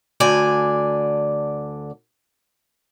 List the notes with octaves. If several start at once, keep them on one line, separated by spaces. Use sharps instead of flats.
D2 D3 D5 G#5